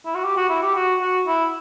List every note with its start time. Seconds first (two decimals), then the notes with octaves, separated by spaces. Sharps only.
0.05 E4
0.15 F#4
0.24 G4
0.37 F#4
0.50 E4
0.63 G4
0.76 F#4
1.01 F#4
1.27 E4